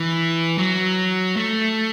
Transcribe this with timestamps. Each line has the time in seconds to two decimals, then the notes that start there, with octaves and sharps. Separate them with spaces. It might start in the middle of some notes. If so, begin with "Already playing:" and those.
Already playing: E3
0.58 F#3
1.37 A3